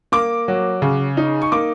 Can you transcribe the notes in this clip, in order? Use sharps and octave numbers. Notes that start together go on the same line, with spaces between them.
A#3 D6
F#3
C#3
D#4
C#6
A#3 D6